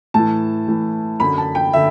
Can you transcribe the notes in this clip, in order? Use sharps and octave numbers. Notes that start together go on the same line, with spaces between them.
A2 E3 A5
A2 E3
F#2 D3 B5
A5
G5
D3 E5